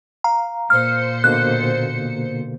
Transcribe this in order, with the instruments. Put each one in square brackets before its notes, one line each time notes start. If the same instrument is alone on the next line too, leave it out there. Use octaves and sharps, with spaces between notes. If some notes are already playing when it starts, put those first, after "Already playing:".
[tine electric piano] F5 [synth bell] A#5
[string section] A#2 C5 C#7 [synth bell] F6
[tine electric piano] B2 D3 A#3 [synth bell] F#6